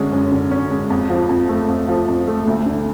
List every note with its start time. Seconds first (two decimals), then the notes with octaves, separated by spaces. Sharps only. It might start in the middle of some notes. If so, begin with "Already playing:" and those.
Already playing: F#2 D3 G#3 C#4
0.12 F#2
0.32 D3
0.51 C#4
0.71 G#3
0.90 F2
1.10 F3
1.29 F2
1.49 A3
1.68 F2
1.88 F3
2.08 F2
2.28 A3
2.47 D2
2.66 D3